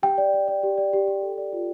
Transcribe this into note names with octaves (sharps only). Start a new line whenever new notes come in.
G4 G5
D5
D5
D5
G4
D5
G4
G4
A4
D5
F4